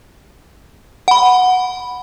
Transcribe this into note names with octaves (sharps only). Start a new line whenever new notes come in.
F#5 B5